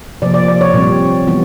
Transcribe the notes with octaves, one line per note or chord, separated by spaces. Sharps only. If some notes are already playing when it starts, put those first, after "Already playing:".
C3 F3 A#3 D5
D5
D5
C#5
A#2 G3 C4
E3 G3 B3